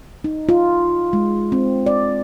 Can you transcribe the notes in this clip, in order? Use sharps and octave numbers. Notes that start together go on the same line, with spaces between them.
D#4
F4
G#3
C4
D5